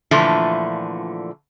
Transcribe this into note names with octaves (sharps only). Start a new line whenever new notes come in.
A#2 D3 E3 F3 A3